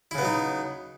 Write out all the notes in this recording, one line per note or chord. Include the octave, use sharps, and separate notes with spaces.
C#3 F#3 B3 D#4 E4